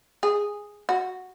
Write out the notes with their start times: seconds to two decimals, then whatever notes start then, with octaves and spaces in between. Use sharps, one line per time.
0.23 G#4
0.89 F#4